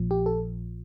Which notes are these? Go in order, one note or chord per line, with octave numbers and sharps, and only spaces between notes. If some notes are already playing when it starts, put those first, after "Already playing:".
Already playing: A#1 A#2 F3
G4
A4